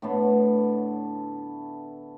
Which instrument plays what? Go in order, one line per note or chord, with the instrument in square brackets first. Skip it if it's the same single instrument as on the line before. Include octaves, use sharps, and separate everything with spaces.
[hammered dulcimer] A2 D3 A3 B3